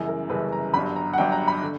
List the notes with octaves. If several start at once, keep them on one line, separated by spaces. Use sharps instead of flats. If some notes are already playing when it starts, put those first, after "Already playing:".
Already playing: G1 F#2 C#3 E3
A#4
G1 F#2 C#3 E3 B4
A#5
G1 G2 F#3 B5
A#5
F#5
G1 G2 F#3 G5
A#5
B5
D3